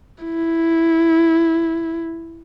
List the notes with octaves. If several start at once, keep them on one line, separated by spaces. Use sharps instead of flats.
E4